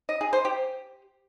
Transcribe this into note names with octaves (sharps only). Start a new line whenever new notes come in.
D#5
G#4
C5
G4